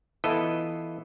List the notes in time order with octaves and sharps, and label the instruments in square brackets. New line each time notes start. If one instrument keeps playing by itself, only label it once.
[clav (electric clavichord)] E3 B3 E4 F4 A4 D#5